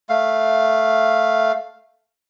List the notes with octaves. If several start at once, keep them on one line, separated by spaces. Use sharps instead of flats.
A3 F5